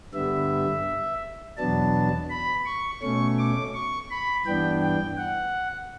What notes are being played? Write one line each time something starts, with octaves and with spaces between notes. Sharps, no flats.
G2 D3 G3 B3 E5
E2 B2 F#3 B3 D4 A5
B5
C#6
B2 A3 C#4 C#6
D6
C#6
B5
G2 E3 B3 D4 G5
G5
F#5